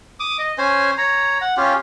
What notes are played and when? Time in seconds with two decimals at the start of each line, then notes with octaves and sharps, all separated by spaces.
0.20 D6 D#6
0.39 D#5
0.58 C#4 C5 G#5
0.98 C#5 A#5
1.41 F#5
1.57 C#4 F4 G4